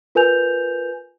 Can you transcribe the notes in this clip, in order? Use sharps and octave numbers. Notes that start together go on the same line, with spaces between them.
F4 A#4 B4 G#5 G6 F7